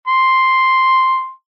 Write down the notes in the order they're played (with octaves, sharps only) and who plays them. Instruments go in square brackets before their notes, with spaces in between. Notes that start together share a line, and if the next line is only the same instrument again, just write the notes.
[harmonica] C6